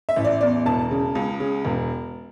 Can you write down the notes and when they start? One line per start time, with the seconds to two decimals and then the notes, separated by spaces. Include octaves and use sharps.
0.09 E5
0.16 A1
0.25 D5
0.41 E2 D5
0.66 E1 A5
0.91 C#3
1.15 C#2
1.40 C#3
1.65 E1